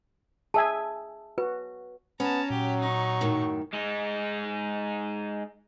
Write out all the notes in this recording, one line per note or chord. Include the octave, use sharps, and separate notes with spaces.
G#4 E5 G#5 A5
F#4 B4
B3 C#4 A5 A#5
A#2 F#3 G4
D#4 C#6
F#2 A2 D#3
G#3 D#4